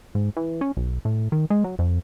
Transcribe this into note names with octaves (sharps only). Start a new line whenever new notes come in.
G#2
E3
C#4
B1
A2
D#3
G#3
F#3
F2